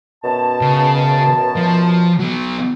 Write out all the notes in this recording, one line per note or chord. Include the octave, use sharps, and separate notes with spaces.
F#2 B2 A5
C#3
F3
F#3 B3